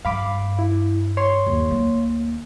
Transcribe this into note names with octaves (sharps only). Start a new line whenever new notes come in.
G2 F5 B5 D6
E4
C#5 C6
D#2
D2 A#3